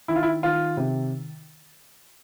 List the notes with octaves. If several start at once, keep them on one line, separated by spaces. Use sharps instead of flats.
D#3 E4
F4
E4
D#3 F4
C3